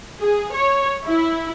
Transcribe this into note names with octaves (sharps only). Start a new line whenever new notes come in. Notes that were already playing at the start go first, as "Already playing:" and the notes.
G#4
C#5
E4